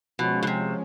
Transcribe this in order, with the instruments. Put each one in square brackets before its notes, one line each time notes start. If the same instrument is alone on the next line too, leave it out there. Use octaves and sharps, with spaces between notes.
[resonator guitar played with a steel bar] B2 [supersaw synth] F3 G#3 C#4
[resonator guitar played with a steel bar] B2
C3